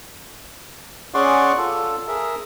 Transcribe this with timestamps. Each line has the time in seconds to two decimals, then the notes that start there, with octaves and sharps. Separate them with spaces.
1.14 C#4 G#4 D5 F#5 C6 C#6
1.57 F4 A4
2.08 G#4 A#4 E5